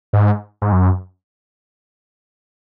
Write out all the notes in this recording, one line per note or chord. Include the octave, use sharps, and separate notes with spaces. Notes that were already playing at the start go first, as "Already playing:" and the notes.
G#2
G#2
F#2